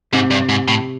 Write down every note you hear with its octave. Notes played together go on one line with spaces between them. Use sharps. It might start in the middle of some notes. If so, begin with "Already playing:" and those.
G#2 C3
G2
G#2
A2